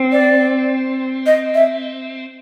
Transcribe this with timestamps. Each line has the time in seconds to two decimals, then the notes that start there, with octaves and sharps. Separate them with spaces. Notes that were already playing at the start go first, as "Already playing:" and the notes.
Already playing: C4
0.12 D5
1.26 D#5
1.55 E5